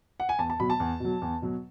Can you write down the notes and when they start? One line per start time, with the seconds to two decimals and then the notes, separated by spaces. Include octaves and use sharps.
0.20 F#5
0.29 G#5
0.39 E2 A5
0.50 A5
0.60 B2 F#3 B5
0.70 A5
0.80 E2
1.00 B2 F#3
1.22 E2
1.42 B2 F#3